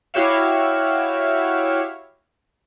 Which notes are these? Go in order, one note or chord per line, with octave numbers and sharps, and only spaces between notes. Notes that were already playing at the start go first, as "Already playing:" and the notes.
E4 F#4 G4 C#5 E5 F5